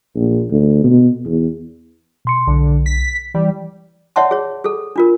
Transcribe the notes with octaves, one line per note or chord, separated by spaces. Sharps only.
A#1
D2
B2
E2
B2 C6 C#7
B1 D3
B6
E3 G3
C#5 D5 E5 F#5 A5 C6
G#4 C#5
G#4 A4
D4 F4 A#4